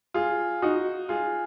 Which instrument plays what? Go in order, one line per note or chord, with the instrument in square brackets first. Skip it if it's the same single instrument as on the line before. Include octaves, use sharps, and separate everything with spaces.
[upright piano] F4 G#4
D#4 F#4
F4 G#4